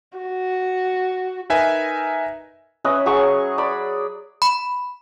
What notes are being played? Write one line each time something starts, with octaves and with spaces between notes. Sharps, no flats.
F#4
D#4 A#4 B4 E5 G#5
C#4 B4 D#5 E5
F#3 G#4 C#6
D5 B5
B5